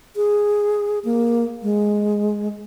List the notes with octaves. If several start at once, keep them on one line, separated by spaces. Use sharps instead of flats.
G#4
A#3
G#3